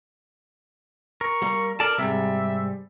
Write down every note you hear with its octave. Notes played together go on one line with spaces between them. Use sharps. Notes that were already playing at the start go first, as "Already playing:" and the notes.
A#4 C#6
G3 A#3
A4 A#4 D5 A5
G#2 C3 G3 E5